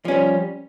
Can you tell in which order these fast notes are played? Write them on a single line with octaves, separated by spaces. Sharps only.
F3 C#4 G3